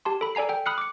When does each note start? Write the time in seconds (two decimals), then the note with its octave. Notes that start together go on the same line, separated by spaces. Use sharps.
0.05 G4 A5 C6
0.21 A4 B5
0.35 A4 D5 G#5 A#5 C7
0.49 A4 G5
0.66 B5 D#6 F6 F#6 C7 C#7
0.78 D6 C#7